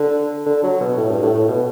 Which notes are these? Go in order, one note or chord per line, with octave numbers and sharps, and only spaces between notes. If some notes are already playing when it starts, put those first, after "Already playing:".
Already playing: D3
D3
F#3
B2
A2
G2
A2
A2
B2